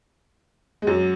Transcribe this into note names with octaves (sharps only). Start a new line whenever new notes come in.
G#3
F#2 F#3